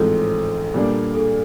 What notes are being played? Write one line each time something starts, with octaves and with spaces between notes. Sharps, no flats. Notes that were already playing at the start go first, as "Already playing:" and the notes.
Already playing: A1 G#2 F3 G#3 C4 A4
A#2 G3 A#3 D4 G#4
A4
G#4